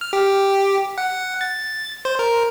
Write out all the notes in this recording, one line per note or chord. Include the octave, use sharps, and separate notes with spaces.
F6
G4
F#5
A6
C5
A#4